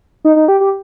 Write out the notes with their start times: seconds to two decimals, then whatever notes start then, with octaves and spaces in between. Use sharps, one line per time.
0.25 D#4
0.36 D#4
0.48 G4
0.60 G4